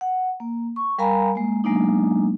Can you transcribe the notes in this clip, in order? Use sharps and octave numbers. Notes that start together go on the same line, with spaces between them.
F#5
A#3
C#6
G3 A#4 F5 G#5 A#5 B5
G#3 A#3
F#3 G#3 A#3 B3 D4 D#4